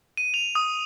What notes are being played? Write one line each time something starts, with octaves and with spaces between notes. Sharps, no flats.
D#7
F7
D#6